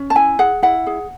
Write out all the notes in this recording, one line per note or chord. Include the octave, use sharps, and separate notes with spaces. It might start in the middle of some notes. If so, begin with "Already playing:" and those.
Already playing: C#4
A5
E4 G#5
G#4 F#5
E4 F#5
G#4